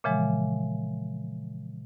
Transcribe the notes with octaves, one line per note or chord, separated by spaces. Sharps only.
A#2 C#3 E3 F3 G#3